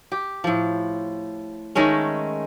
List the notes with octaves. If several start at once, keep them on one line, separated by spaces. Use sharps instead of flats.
G4
A2 F3
D#3 G#3 A3 C#4